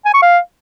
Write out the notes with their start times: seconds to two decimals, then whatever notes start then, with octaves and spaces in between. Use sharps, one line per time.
0.05 G#5
0.14 C#6
0.22 F5